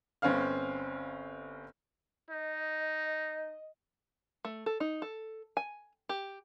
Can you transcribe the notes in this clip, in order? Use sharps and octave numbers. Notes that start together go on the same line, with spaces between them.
G1 C4 C#4 B4 F5 F6
D#4 D#5
A3
A4
D#4
A4
G#5
G4